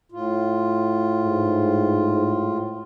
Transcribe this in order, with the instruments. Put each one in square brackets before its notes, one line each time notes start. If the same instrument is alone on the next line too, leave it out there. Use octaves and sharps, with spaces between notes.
[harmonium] A2 F4
[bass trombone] G#2